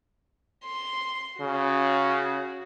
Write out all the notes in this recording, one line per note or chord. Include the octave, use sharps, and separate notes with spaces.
C6
C#3 F#4